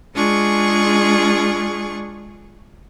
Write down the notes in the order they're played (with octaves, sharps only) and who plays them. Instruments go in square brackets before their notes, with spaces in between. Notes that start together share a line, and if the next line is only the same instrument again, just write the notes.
[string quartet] G#3 D4 F4 G#4 C#6